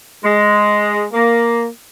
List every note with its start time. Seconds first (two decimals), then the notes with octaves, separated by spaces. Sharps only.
0.24 G#3
1.13 A#3